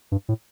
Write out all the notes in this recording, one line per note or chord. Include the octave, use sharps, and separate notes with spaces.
G2
A2